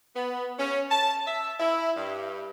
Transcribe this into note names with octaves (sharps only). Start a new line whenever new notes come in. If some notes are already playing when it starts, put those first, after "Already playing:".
B3
C#4
A5
E5
E4
G2